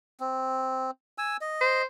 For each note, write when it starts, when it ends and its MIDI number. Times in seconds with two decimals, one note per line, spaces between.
0.20 0.91 60
1.18 1.37 80
1.18 1.37 88
1.41 1.82 75
1.61 1.84 72